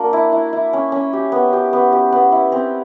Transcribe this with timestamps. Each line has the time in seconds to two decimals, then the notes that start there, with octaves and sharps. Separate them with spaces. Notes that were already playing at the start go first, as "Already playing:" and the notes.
Already playing: A#3 D4 F#4
0.13 E4
0.32 E4
0.53 E4
0.73 C#4
0.92 C#4
1.13 G4
1.32 B3
1.53 G4
1.73 B3
1.92 G4
2.12 B3
2.32 E4
2.52 C4